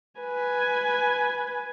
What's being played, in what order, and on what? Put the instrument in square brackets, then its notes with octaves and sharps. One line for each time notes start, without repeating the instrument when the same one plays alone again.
[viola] B4 G#5